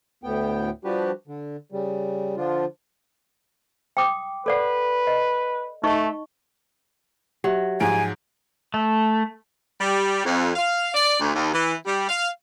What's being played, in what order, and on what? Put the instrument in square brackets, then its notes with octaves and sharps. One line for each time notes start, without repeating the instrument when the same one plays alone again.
[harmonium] D2 A2 B3 G5
F3 G3 D4 F#4 G4 B4
D3
C#3 G3
D3 F3 D4 F4
[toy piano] G5 D6 D#6
[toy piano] A4 D5 F#5 [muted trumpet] B4
[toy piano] D#5
[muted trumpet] A3 [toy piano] D#4 D#5 C#6
[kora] F#3 [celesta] G4 E5
[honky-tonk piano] G#2 F3 D7 [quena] G#5
[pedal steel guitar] A3
[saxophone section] G3
F2
F5
D5
D2
D#2
E3
G3
F5